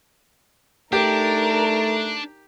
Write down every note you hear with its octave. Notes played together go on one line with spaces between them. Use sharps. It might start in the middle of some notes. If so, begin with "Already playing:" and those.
A3 D4 D#4 G4 A#4